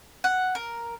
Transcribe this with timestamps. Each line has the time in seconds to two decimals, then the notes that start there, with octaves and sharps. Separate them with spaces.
0.24 F#5
0.55 A#4